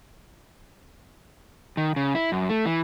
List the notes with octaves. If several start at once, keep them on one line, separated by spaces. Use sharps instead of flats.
D#3
C#3
E4
F#2
A3
E3